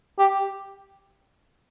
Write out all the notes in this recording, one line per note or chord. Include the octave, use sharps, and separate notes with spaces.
G4